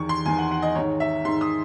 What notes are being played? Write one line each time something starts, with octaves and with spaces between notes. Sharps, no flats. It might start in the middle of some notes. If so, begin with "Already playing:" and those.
Already playing: E2 D#3 C#6
C6
E2 D#3 G#5
F#5
F#5
D#5
G#2 D#3 C#5
E5
G#2 D#3 C6
D#6